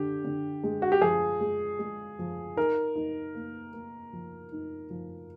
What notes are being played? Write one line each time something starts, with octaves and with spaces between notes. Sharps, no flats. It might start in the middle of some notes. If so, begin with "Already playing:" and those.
Already playing: D3 G4
D3
G#3
F#4
G4
F3 G#4
G#3
G#3
F3
D#4 A#4
D#4
A#3
A#3
F3
D#4
F3